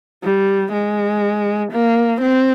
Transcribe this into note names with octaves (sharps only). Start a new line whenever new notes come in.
G3
G#3
A#3
C4